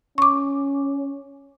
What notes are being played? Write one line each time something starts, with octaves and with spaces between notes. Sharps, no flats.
C#4 C#6 D6